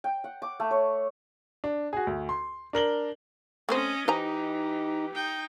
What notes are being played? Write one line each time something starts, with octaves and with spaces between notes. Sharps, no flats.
G5
F#5
D6
A3
C#5
D4
F#4 G#4
D2
C6
D4 A#4 F#7 G7
A3 C4 C#4 C5 D#5
E3 D#4 G4 C5 G#5 A#5
D#4 G5